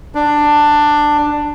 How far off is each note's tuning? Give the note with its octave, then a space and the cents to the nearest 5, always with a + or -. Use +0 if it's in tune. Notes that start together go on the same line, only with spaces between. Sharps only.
D4 +10